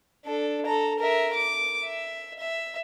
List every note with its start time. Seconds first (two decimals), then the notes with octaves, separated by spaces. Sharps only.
0.25 D4 A4
0.66 A4 A#5
0.99 A#4 E5
1.34 D6
1.84 E5
2.39 E5